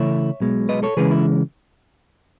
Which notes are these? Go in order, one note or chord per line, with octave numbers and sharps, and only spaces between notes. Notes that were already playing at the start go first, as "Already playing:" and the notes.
Already playing: C#3 E3 A3 E4 C#5 E5
B1 B2 G#3
B4 D#5
A4 C#5
C#3 E3 G#3 C#4 G#4 B4
E4